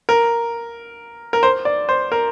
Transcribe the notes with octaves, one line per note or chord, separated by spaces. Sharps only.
A#4
A#4
C5
D5
C5
A#4